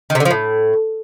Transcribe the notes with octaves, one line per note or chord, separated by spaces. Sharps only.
D#3
C3
D3
F3
A2